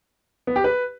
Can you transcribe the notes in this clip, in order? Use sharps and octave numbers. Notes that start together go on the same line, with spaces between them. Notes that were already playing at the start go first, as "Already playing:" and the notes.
B3
G4
B4